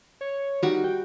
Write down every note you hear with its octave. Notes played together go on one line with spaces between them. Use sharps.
C#5
D#3 G3 F#4
G5